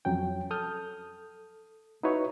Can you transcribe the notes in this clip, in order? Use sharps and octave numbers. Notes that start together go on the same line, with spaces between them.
F2 F#3 C#4 G5
A4 D#6 F6 G6
D#4 E4 F#4 B4 C#5